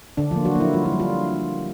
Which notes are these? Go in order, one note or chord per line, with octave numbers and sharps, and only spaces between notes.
D3 D4
F3 A#3 F4
F#3 F#4
A#3
E4
G3 F4
E4
G3
F4